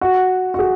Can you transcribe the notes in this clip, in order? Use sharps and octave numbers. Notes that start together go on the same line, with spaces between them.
F#4
F#4
G#4